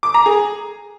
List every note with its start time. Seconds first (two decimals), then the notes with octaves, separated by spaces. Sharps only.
0.03 D6
0.14 A#5
0.26 G#4